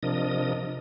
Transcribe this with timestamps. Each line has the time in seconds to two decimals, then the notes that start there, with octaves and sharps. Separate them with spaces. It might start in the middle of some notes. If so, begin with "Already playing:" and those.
0.03 C3 F3 D4 A#4 D#5 D#6